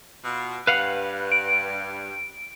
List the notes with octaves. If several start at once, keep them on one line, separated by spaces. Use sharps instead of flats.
B2 F4
G2 B4 F5 F#5
D7